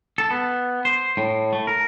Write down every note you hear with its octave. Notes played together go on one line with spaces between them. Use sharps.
A4
B3
C5
A2
A3
A#4